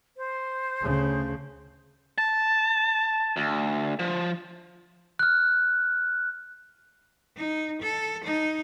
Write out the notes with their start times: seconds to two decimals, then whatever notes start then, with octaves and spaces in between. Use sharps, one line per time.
0.17 C5
0.82 D2 C#3
2.18 A5
3.37 D2
3.99 F3
5.19 F6 F#6
7.37 D#4
7.82 A4
8.24 D#4